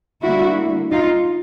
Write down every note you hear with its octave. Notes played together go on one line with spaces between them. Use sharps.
D3 G3 A#3 E4 F#4
D#4 F4